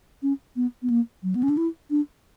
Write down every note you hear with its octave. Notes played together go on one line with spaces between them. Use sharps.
C#4
B3
B3
A#3
F#3
B3
C#4
D4
E4
D4